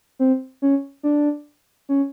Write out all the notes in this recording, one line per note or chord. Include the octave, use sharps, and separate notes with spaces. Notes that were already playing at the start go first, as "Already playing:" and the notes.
C4
C#4
D4
C#4